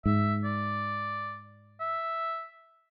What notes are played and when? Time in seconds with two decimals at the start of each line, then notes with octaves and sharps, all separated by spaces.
0.06 G#2 E5
0.44 D5
1.80 E5